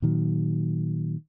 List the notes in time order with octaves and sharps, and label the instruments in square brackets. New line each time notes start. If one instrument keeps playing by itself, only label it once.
[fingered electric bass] A#2 D#3 F#3